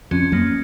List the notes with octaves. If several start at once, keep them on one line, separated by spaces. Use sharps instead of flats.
F2 C#4
F#2 A#3